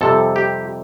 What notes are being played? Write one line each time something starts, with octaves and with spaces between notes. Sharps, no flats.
F2 C3 G3 A4
G4